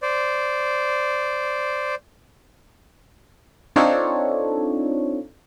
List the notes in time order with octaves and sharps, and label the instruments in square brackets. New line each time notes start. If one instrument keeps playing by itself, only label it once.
[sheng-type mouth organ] C5 D5
[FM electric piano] C4 D4 D#4 F4 A4 C#5